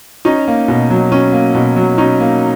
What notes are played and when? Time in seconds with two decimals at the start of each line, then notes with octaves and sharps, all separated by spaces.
0.25 C#4 D#4
0.48 A#3
0.68 B2
0.90 F#3
1.12 C#4
1.33 A#3
1.55 B2
1.76 F#3
1.98 C#4 D#4
2.20 A#3